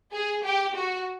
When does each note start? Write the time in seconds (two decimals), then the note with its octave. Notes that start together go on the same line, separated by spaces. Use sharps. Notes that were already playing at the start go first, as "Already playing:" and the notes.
0.12 G#4
0.44 G4
0.75 F#4